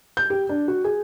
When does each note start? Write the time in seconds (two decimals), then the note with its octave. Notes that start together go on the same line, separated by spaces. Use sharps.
0.17 G6
0.30 G4
0.49 D4
0.68 F#4
0.84 G#4